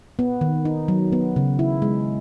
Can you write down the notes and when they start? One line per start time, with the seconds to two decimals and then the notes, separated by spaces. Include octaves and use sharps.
0.19 B3
0.41 D#3
0.65 D#4
0.88 F#3
1.12 B3
1.36 C#3
1.59 E4
1.82 G#3